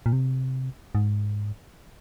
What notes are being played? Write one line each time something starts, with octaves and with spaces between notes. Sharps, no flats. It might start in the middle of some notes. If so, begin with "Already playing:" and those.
A#2
C3
G#2